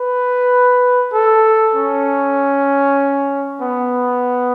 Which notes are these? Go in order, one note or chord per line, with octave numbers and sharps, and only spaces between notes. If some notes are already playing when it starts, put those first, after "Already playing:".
Already playing: B4
A4
C#4
B3